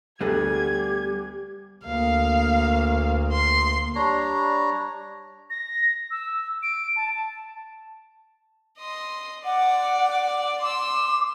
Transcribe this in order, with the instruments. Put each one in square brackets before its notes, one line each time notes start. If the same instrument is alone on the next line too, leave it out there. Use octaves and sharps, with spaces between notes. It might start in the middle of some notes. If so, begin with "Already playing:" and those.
[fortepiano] D2 A3 [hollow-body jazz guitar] G3 B3 G#4 [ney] G4 [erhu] G#6
[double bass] D2 A#3 [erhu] F5
[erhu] C6
[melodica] G3 D4 C#5 A#5
[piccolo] A#6
E6
D7
A5
[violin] D#5 C6
[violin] D5 D6 [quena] F#5
[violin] C6 E6 [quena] D6